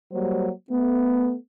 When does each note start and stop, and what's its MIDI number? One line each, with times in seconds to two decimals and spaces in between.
0.11 0.48 54
0.11 0.48 55
0.11 0.48 58
0.11 0.48 72
0.70 1.33 57
0.70 1.33 59